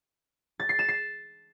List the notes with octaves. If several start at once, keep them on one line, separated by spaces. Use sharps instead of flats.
A6
C7
E7
C7